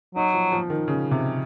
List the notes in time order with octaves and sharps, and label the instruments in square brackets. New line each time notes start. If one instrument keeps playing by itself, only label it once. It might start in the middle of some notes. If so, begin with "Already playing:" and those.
[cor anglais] F#3 [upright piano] D#4
[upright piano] F3
F3
D#3
C#3
C3